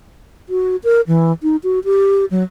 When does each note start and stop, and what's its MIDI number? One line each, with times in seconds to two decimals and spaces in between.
0.49 0.76 66
0.84 1.01 70
1.07 1.32 52
1.43 1.56 63
1.63 1.79 66
1.85 2.25 67
2.31 2.43 54